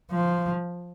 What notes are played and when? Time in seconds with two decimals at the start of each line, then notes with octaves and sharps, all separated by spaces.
0.12 F3